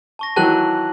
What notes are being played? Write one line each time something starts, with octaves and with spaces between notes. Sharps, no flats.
A5 C#6 A#6
D#3 E3 F#3 A5 F#6 F#7